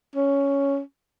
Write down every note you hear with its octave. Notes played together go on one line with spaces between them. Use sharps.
C#4